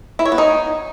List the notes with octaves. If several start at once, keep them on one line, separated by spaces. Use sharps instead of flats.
E4
C#5
B3
D#4